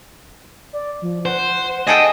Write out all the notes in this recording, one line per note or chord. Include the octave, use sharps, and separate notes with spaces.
D5
F3
C5 F#5
G#4 A4 D#5 G5